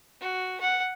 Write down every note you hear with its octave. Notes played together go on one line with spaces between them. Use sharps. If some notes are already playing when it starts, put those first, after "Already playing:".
F#4
F#5